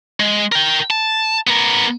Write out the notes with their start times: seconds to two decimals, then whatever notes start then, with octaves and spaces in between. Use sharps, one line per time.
0.20 G#3
0.52 A#4 G5
0.90 A5
1.47 B3 A#4